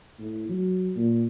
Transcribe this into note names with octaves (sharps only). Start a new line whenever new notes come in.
A2
F#3
A#2